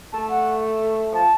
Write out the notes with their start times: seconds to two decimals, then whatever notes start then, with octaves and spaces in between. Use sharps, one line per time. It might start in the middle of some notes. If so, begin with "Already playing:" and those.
0.13 A3 A5
0.30 F#5
1.13 F3 A5